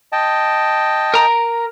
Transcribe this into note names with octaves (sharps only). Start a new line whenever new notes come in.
D#5 G5 A5
A#4 A#5